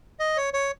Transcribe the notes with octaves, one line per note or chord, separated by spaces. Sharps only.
D#5
C#5
C#5